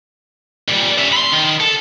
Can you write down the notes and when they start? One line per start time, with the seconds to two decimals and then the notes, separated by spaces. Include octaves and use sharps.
0.68 A#2 G3
0.98 C#4 E5
1.13 B5 C6
1.32 D#3
1.61 A4